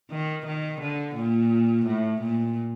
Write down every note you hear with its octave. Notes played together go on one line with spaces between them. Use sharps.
D#3
D#3
D3
A#2
A2
A#2